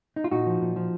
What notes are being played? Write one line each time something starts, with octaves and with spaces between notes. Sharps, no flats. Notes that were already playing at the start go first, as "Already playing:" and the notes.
D#4
F4
A#2 D#4 F#4
F3
A#2
F3